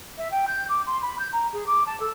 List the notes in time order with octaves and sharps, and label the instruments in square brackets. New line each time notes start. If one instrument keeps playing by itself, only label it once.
[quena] E5
G5
G6
D6
C6
B5
G6
A#5
G#4
D6
A5
A4